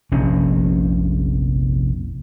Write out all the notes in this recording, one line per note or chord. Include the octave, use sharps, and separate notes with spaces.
F1 A#1 C3 C#4